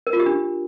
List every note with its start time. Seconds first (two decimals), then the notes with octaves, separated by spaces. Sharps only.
0.07 A#4
0.13 F4
0.20 G4
0.26 D4